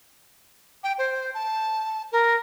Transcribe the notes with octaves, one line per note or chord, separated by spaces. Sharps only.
G5
C5
A5
A#4